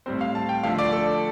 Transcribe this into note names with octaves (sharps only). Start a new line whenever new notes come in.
A2 G3 C4 C5
F5
A5
G5
D3 F3 A3 F5
D5
A4